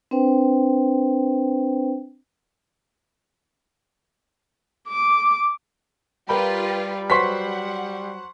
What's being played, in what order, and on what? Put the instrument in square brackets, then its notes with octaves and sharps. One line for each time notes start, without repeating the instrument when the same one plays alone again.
[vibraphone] C4 D4 B4 C5 G5
[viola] D6
[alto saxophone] G3 [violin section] F4 G4 B4 [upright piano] A#4 G5 B5
[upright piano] F#3 B4 C5 [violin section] F#5 [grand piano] C6 C#6 B6